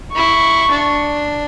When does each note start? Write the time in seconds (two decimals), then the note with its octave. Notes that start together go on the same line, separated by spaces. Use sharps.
0.15 E4 C#6
0.71 D4